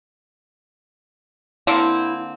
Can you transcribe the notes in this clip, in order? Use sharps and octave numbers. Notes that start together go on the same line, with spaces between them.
D3 A#3 C4 E4